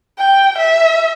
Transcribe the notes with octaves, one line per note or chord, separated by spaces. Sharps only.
G5
E5